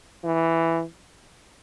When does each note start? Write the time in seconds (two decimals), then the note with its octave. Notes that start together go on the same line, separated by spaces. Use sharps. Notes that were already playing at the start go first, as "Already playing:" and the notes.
0.24 E3